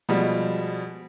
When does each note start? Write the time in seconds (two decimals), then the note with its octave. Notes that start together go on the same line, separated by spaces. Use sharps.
0.09 B2 F3 G3 G#3